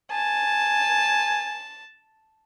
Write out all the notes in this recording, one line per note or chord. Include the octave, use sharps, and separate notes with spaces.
G#5 A5